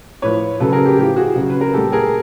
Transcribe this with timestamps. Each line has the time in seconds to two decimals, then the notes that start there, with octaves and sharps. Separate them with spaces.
0.22 A2 F3 B4 C#5
0.60 C#3 F#3 A4 B4
0.72 G#4 A#4
0.85 G4
0.98 A2 F3 G4
1.16 F#4 G#4
1.36 C#3 F#3
1.50 B4
1.61 A#4
1.73 A#2 G3 G4 A4
1.92 G#4 A#4